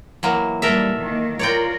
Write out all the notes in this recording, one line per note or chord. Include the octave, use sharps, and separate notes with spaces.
E3 F#3 A#3
A#2 G3 A4 A#4 E5
D#3 A#3
F4 A#4 C#5 D5 G5